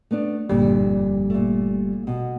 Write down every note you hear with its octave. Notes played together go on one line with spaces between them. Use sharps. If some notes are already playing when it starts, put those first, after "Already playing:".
A3 B3 D4
G1 F2 A#2 G3 D4
A#2 A3
B2